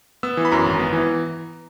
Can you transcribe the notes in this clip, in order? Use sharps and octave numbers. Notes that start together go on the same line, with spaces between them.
B3 E6
E3
B5
F#2 A#5
G#1
B3
E3